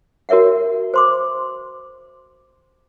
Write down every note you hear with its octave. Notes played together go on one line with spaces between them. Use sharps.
F#4 A#4 C#5 E5 F#5
C5 C6 D6